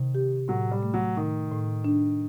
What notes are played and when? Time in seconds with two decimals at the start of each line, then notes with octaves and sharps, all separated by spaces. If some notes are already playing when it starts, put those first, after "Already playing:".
Already playing: C3 D#3
0.15 G4
0.48 A2 F#3
0.71 G3
0.83 A3
0.94 F#3
1.17 A2 D#3
1.51 A2
1.84 D4